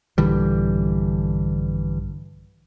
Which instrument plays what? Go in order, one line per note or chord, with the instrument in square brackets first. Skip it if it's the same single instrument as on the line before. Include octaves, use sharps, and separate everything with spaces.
[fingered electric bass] A#1 G2 [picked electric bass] D3 E3 G3